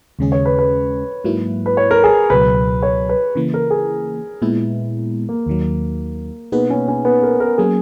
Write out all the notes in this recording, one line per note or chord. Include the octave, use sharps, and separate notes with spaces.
D#2 C#3 G#3 C#4 G#4
C#5
B4
B4
G#2 F#3 A#3 E4
B4
C#5
A#4
G#4
C#2 B2 F#3 B4
C#5
B4
C#3 E3 A#3
A#4
G#4
A#2 G#3 B3 E4
A#3
D#2 D#3 F#3
B2 A#3 B3 D#4 G#4 B4
C#4
C#4
B3
A#4
A#4
F#3 A#3 C#4 G#4